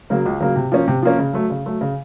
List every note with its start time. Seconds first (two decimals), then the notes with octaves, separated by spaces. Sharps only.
0.10 C#3 F#3 A#3
0.26 C#2
0.40 C#3 F#3 A#3
0.56 C3
0.72 F3 A#3 C#4
0.88 C3
1.03 F3 A#3 C#4
1.19 C#3
1.33 F#3 A3
1.50 C#3
1.66 F#3 A3
1.81 C#3